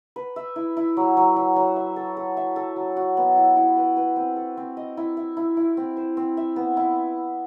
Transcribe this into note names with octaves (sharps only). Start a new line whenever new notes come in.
B4
E5
E4
E4
F#3
F#3
F#3
F#3
E5
A4
A4
E5
A4
F#3
F#4
B3
E4
E4
B4
B4
C4
A4
C4
D#5
E4
E5
E4
E4
C4
C5
C4
E5
B3
E4